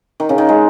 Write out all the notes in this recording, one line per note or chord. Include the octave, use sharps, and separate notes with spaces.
D#3
C#3
D#3
G#3